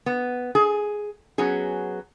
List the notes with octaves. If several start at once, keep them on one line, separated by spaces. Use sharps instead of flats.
B3
G#4
F#3 B3 C#4 G#4